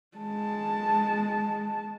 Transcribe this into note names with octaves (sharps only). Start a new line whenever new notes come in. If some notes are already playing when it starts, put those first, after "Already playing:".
G#3 A5